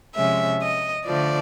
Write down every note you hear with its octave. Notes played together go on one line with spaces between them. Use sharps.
C3 F3 G#3 C#4 E5
D#5
D3 F3 A3 D5